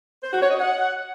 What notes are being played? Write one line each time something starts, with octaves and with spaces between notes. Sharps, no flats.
C5
F#4
C#5
D#5
F#5